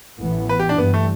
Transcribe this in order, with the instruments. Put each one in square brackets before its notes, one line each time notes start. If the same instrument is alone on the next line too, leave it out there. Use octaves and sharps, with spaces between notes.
[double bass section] A1 A2 E3 B3
[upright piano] B4
G4
D4
[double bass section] G1 G2 E3 G3 [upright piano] B3
[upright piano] A3